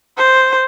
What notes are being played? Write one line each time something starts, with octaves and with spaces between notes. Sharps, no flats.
C5